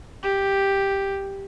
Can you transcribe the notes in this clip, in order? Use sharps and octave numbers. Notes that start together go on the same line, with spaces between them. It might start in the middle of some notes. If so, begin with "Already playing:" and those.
G4